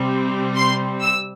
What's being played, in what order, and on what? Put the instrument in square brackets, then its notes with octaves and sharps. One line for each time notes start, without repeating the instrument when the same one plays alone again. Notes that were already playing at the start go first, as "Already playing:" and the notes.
Already playing: [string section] C3 G3 C4
C6
E6